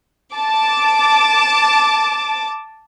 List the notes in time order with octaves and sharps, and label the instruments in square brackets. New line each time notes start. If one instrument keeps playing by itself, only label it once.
[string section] A5 D6